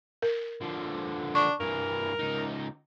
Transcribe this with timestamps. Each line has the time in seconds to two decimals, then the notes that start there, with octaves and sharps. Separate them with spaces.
0.22 A#4
0.61 D3 F3
1.35 D4 C#6
1.60 G2 E3 A#4
2.19 C#2 D#4